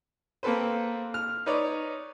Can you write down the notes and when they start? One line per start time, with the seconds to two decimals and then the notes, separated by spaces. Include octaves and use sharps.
0.43 A#3 C4 A4 B4 C5
1.14 F6
1.46 D#4 B4 C#5 D5